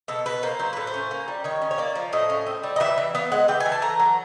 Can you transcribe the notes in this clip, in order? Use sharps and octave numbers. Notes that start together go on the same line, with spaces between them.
B2 A4
B2 B4
A#3 C5
F#3 C5
A2 B4
C5
C#4
A#3
G3
D#3 C#5
C#4
C#5
A#3 D5
F3
A2 D#5
C#4
C4
G3
D#5
E3 E5
E3
B3 F5
G#3 F#5
E3 G5
G#5
E3
A5
A3 A#5
F#3